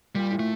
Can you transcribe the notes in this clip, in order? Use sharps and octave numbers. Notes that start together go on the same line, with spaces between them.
A#2 G3
A2
A3